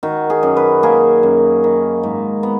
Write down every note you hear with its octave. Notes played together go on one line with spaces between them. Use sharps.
D#3 F#4
G#4
F#2
B4
A#3 G#4
F#2
D#3
G#2
B3